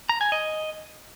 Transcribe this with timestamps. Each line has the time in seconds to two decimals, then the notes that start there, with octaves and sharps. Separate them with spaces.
0.09 A#5
0.21 G#5
0.32 D#5